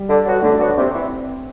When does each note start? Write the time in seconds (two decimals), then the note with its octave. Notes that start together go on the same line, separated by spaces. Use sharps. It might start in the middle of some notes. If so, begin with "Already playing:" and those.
Already playing: G3
0.09 D3
0.26 F#3 B3 F#4
0.42 D3 A3
0.52 D4
0.60 F#3 B3 F#4
0.68 D4
0.77 C3 C4
0.94 E3